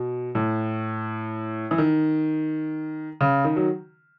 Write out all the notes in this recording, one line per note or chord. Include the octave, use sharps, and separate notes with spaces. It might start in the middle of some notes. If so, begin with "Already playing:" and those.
Already playing: B2
A2
E3
D#3
C#3
D#3
F#3